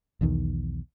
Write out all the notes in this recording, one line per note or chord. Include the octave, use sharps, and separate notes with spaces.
B1 E2 D#3